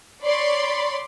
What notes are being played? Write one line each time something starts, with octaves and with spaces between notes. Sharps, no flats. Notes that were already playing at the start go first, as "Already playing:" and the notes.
C#5 D5 B5 C6